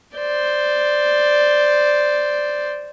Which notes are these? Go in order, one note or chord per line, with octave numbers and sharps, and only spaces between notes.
C5 D5